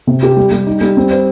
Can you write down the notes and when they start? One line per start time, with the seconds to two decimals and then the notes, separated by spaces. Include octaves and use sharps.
0.07 C3
0.23 G4
0.37 G3
0.52 G3
0.67 D#4
0.81 G3
0.97 C4
1.11 C5